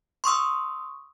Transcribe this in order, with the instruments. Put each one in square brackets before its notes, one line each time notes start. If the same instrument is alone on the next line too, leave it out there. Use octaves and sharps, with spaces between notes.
[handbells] C6 C#6 D#6 E6